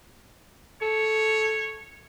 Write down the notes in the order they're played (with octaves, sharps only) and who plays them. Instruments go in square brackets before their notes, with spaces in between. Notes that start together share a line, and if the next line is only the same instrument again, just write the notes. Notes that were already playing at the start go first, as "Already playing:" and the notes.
[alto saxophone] A4 [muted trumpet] C#5